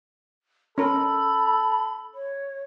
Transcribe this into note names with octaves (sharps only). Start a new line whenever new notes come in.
C#4 A4 A#4 B5
C#5